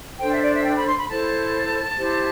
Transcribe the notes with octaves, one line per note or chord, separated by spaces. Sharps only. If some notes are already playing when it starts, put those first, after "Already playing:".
D4 A4 C5 G5
E5
D5
E5
G5
B5
C6
B5
E4 A4 C5 A5
E4 G4 C5